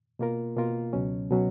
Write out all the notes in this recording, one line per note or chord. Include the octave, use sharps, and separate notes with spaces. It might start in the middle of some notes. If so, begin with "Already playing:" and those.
B2 A#3 F4 A#4
B2 A#3 F4 A#4
C#2 B2 F#3 C#4
B2 F#3 C#4